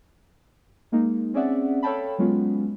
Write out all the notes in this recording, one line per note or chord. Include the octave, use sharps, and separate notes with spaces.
G#3 A#3 D#4
C4 C#4 G#4 D5 E5 F#5
A4 C#5 F5 G5 A5 B5
F#3 G#3 B3 C#4 F4